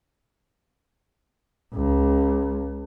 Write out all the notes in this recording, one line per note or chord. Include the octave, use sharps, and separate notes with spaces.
C#2